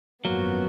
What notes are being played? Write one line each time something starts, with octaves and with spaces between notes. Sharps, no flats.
G#1 F#2 F3 F#3 A#3 B3 F#4